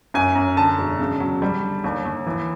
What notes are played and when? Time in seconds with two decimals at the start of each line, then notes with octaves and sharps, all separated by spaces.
0.14 F#2 G#5
0.35 F#2
0.57 D3 A5
0.79 E1
1.00 C#3
1.20 F#3
1.42 G3
1.63 D3
1.84 D#2
2.05 D#2
2.26 E3